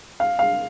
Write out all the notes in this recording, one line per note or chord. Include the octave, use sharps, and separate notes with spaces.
F5
F5